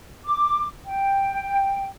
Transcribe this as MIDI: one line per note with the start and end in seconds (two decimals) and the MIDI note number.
0.24 0.65 86
0.85 1.85 79